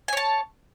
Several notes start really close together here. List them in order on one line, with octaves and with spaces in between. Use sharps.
G#5 C#5 A5